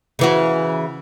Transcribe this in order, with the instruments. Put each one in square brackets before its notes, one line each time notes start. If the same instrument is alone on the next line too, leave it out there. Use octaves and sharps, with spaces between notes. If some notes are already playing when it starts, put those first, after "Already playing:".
[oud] C#3 E3 F#4